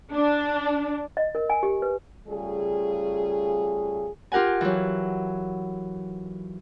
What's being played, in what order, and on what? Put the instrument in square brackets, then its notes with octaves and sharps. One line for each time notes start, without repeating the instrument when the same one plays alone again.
[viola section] D4
[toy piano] D#5
A#4
G#5
G4
B4
[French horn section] C#3 G3 A3 F4 G#4
[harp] F4 G4 A#4 F#5 G#5
E3 F#3